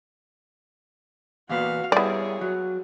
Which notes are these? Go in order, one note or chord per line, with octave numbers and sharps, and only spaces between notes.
E2 A#2 B3 F#4 F5
G3 B3 E4 G#4 C#5 D5
F#3